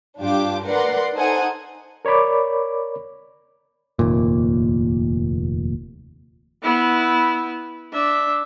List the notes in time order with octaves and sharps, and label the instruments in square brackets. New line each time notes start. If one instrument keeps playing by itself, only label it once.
[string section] G2 D4 F4 G4 D6
A#4 B4 D5 F#5 C6
D#4 A4 C5 F#5 G#5
[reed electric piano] A#4 C#5 D5 B5 D6
[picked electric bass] F1 D#2 A#2
[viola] B3 E4
D4 E5